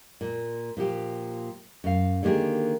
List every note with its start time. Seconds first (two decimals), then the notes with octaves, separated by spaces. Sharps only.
0.21 A#2
0.77 A#2 F3 G4
1.84 F#2 F5
2.23 D3 D#3 A#3 G4 G#4